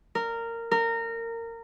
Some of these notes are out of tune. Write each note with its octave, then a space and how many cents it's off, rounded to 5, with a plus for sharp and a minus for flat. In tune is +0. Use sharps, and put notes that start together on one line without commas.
A#4 -15
A#4 -20